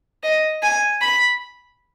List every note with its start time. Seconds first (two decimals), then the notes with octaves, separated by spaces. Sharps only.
0.24 D#5
0.63 G#5
1.01 B5